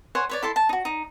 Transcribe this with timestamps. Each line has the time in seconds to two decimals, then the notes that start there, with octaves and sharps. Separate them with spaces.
0.15 C5 C#5 F#5 G#5
0.29 B4 C#5 D5
0.43 E4 A4 A5 C6
0.56 A5
0.69 D#4 F#4
0.85 D#4